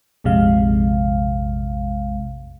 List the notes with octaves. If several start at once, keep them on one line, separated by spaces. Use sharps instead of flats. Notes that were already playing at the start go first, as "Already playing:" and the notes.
A#1 F2 C3 G#3 F5